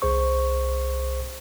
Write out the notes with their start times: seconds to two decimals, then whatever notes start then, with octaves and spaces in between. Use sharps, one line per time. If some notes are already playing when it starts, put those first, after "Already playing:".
0.02 C2 G#4 C5 C#6